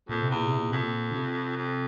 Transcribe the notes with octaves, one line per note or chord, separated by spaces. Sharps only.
F2 A#2
C3
E2 A#2
C3
A#2
F2 C3
A#2
D3
C3
F2